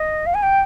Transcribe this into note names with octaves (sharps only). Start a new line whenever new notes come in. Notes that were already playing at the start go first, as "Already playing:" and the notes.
Already playing: D#5
F5
G#5
G5